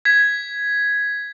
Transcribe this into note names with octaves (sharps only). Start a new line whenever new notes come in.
G#6 B6